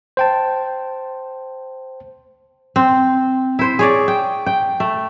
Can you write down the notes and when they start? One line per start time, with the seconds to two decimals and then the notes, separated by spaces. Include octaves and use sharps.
0.17 C5 G5 A5
2.76 C4
3.59 E4 C5
3.79 G#4 C#5 D5
4.08 G5
4.46 G5
4.80 A3